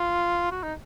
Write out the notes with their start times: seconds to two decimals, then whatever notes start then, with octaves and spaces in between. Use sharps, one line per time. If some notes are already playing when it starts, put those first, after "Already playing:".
Already playing: F4
0.52 F#4
0.63 D#4